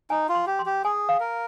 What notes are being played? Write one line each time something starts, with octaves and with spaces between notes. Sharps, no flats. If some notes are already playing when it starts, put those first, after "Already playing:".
D#4 G#5
F4
C6
G4
C6
G4
G#4 G#5
F5
A#4